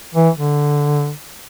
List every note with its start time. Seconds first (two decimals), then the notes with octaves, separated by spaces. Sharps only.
0.14 E3
0.36 D3